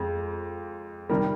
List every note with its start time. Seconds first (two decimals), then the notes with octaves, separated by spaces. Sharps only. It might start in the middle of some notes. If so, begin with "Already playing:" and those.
Already playing: F2 G#3
1.09 C3 D#3 G3 G4 A#4